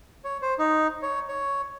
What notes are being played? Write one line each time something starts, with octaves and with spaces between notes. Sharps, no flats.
C#5
C5
D#4
C#5
C#5